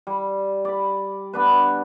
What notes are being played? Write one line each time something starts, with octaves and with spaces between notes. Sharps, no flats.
G3
D5 B5
B3 D4 B4